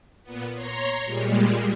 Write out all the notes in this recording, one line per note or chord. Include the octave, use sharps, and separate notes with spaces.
A#2 B3
C#5 A#5 C6
A#2 G3 G#3